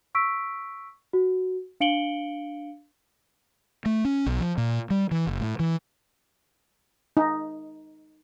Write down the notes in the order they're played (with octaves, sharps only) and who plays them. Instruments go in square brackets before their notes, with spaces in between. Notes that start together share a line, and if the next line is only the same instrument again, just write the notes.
[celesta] C#6 E6 B6 D7
F#4
D4 F5 C#7 D7 F#7 G7
[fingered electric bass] A3
C#4
B1
F3
A#2
G3
E3
F#1
A2
E3
[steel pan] D#4